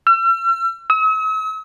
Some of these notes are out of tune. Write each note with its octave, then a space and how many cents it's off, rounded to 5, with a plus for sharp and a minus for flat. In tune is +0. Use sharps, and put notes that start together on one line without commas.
E6 +45
E6 -45